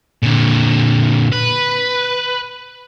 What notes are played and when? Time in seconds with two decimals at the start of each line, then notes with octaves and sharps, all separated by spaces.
0.23 A#2 D3
1.32 B4